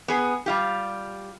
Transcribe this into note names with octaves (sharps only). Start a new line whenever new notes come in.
B3 G#4
G3 F4 G4